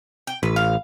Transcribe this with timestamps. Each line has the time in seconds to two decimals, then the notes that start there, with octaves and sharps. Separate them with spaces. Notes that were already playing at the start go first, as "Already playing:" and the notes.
0.27 G5
0.43 A1 B4
0.56 F5